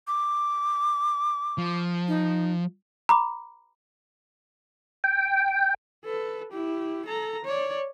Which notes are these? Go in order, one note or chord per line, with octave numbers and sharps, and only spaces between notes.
D6
F3
D#4
A#5 B5 D6
G5
A4 B4
E4 G4
A4 A#5
C#5 D5